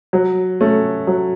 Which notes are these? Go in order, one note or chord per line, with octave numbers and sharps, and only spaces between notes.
F#3
A3 C#4
F#3